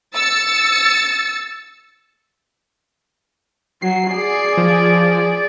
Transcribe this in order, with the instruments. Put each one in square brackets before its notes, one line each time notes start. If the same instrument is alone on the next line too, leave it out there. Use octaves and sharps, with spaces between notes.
[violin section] E6 A6 C#7
[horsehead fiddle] F#3 [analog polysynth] C7
[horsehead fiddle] G#4 D5
[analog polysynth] F3